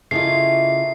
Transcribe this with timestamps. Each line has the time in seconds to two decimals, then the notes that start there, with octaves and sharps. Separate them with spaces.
0.11 C#3 A3 A#3 E4 F4 D#5 C7